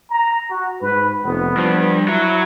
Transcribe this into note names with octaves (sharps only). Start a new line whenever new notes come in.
A#5
F#4
G#2 B4
F1 B3
G2 F3
F#3 E4